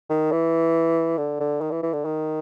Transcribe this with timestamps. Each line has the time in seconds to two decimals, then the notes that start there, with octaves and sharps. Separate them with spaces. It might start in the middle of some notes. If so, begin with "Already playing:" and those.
0.10 D#3
0.32 E3
1.17 D3
1.40 D3
1.61 D#3
1.71 E3
1.83 E3
1.93 D3
2.05 D#3